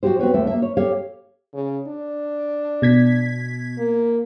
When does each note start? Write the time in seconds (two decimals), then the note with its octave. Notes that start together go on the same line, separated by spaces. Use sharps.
0.03 F3 G#3 F#4 G4 C5
0.19 C4 F#4 B4 C#5
0.34 D#2 F3 A3 E5
0.47 A#3 E5
0.62 C#5
0.77 G4 A4 C#5 F5
1.54 C#3
1.87 D4
2.82 B2 G#6 B6
3.78 A#3